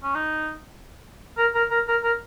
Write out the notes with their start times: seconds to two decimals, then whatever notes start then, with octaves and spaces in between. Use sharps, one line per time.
0.03 C#4
0.15 D#4
1.38 A#4
1.55 A#4
1.71 A#4
1.88 A#4
2.03 A#4